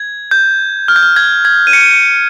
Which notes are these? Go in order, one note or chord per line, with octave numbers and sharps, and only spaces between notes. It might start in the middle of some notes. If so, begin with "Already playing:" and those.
Already playing: G#6
G6
F6
G6
F6
G#6
G#6
D#7
C#7
D#7
C#7